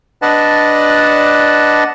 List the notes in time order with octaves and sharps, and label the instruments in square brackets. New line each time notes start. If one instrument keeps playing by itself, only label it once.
[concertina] D4 B4 D5 D#5 F#5 A5